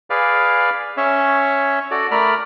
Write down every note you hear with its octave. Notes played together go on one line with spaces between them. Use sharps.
G#4 B4 D5 F5
C#4 C#5 E5
F#4 A4 D5
A3 A#4 D5 B5 F6